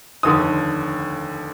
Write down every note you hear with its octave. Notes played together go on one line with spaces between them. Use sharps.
F1 D#2 D3 D#6